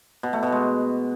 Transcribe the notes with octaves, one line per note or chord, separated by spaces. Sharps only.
B2
A3
B2
G#3